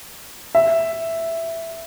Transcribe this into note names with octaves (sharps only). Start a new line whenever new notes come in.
E5